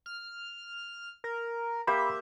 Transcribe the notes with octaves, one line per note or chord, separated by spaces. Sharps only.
F6
A#4
A#3 G4 C5 E5 B5